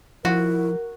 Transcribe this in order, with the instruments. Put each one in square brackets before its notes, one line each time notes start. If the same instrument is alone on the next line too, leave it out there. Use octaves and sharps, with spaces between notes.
[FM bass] F3 [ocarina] E4 [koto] F#4 [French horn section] A#4